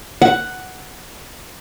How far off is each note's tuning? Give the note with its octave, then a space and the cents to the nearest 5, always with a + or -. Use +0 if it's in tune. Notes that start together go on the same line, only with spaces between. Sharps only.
F#5 +5